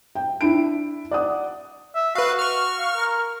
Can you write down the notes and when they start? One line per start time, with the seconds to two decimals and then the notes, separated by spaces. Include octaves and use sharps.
0.15 G5
0.41 D4 E4 D7
1.11 D5 F#5 D#6
1.95 E5
2.15 F#4 B4 F5
2.39 C#6 F6
2.78 F5
2.95 A#4